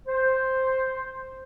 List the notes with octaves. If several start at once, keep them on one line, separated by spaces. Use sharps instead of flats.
C5